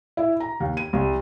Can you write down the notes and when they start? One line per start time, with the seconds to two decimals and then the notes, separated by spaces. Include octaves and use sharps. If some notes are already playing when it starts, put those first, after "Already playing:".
0.17 E4
0.40 A#5
0.60 D#2
0.77 D#7
0.93 C2